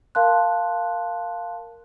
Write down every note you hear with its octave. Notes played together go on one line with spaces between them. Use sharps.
A#4 F5 A5 C6 F#6